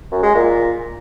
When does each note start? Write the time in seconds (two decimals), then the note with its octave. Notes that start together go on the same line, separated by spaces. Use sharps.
0.12 F#2
0.23 G#3
0.35 A#2